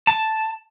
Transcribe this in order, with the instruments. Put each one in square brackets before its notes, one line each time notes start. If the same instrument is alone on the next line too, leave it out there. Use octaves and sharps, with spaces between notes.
[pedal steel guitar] A5